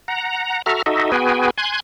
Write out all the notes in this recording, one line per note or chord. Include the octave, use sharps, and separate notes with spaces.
F#5 A#5
F#4 A4 E5 A#5 F6
D#4 F#4 A4 D#5 E5
B3 F#4 G#4 B4 G5 G#5
G#5 C6 F#6 G#6